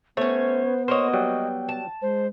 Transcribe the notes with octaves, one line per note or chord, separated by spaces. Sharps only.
A3 B3 C#4 C5 C#5
A#3 F#4 C5 C#5 D#5
F#3 G3 G5
A5
G#3 C5